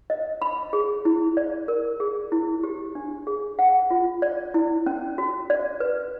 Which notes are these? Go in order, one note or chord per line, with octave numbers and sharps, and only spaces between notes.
D#5
B5
G#4
E4
D5
A#4
G#4
E4
G4
D4
G#4
F#5
F4
D5
E4
C#4
F#4
D5
B4